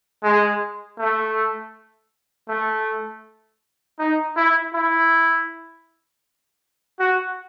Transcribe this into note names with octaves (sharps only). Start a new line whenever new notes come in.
G#3
A3
A3
D#4
E4
E4
F#4